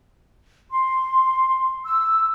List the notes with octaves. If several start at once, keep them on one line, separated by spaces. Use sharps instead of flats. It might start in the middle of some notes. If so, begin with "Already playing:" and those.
C6
E6